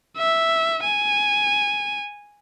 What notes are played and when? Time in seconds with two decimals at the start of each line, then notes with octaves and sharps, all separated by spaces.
0.18 E5
0.83 G#5